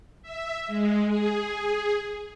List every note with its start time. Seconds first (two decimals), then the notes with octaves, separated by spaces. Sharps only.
0.22 E5
0.67 G#3
1.05 G#4